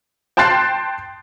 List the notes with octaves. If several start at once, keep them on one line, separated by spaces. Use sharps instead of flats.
G5 A5 C6 F#6 A6 C7